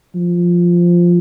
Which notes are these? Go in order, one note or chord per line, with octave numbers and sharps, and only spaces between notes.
F3